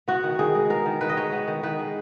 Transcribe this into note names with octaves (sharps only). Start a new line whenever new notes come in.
B3 F#4
D#3
D#3 G#4
G#3
B3 A#4
D#3
D#3 B4
D#5
G#3 C#5
B3
D#3
D#3 B4
G#3